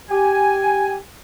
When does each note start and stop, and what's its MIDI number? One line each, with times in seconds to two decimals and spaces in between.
0.10 0.96 67
0.10 0.96 80